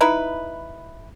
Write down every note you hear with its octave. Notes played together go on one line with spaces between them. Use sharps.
D#4 E4 B4